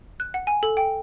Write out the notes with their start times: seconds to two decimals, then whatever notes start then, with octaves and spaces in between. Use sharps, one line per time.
0.20 F#6
0.34 F#5
0.47 G#5
0.63 A4
0.77 G5